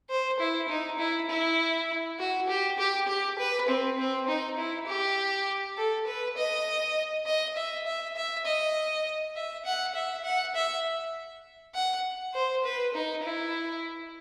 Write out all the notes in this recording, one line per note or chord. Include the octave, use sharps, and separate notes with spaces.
C5
E4
D#4
E4
E4
F#4
G4
G4
G4
B4
C4
C4
D#4
E4
G4
A4
B4
D#5
D#5
E5
E5
E5
D#5
E5
F#5
E5
F#5
E5
F#5
C5
B4
D#4
E4